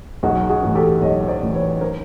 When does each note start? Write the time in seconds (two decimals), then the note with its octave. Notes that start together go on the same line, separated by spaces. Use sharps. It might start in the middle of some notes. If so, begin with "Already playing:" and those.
0.23 B1 F#4 G#4
0.49 F#4 G#4
0.62 A2 E3
0.75 G4 A4
1.01 B1 C#5 D#5
1.28 C5 D5
1.41 A2 E3
1.55 B4 C#5
1.81 A#4 C5